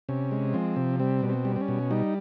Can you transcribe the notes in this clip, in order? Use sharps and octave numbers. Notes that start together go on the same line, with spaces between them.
C3 C#4
G#3
F3 C4
C3
G3 C4
B2
C4
G3
C4
C#4
B2
G3 D#4